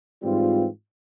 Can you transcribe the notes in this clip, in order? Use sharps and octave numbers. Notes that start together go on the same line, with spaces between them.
G#2 E3 G3 C4 F4